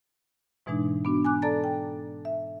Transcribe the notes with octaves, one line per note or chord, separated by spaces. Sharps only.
G#2 B2 E3 G#3 D4 D#4
B3 D4 F#4
G#5 D6 F#6
A4 D5 A5 A#5 A6
G5
E5